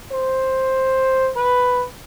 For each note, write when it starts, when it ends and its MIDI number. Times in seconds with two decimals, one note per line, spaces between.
0.12 1.30 72
1.36 1.84 71